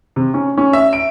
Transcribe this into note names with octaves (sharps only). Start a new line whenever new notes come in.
C3
C#4
C#4
E5
D7